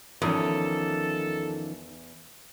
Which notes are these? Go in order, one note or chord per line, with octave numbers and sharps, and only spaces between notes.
E2 D#3 F3 C#4 A4